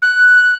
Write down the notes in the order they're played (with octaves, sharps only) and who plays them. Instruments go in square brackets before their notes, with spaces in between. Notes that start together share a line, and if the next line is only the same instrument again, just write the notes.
[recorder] F#6